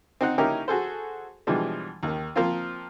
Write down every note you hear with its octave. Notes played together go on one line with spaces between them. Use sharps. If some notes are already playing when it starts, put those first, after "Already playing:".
C4 D#4 F#5
A#3 C#4 D#4 E4 G4 A#4
F#4 G#4 A4 C5
B2 E3 F3 G3 G#3 D4
D#2 D#3
F3 A#3 C4 F4